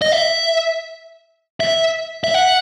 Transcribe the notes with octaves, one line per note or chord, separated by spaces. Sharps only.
D#5
E5
E5
E5
F#5